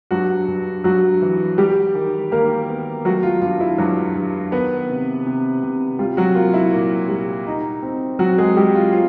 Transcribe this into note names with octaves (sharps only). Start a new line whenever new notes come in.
G2 F#3 F#4
G2
G2 F#3 F#4
E3
G3 G4
D#3
D#3 A#3 A#4
B3
F#3 A3 F#4
F4
G2 F4
E4
G2 F#3 F#4
G2
D#3 B3 B4
C3
C3
C3
G3 F4
F#3 F#4
A#3 F4
E4
A#2
G3
D#4
C4
F#3 C4 F#4
G#3 G#4
G3 G4
F4
C4 F4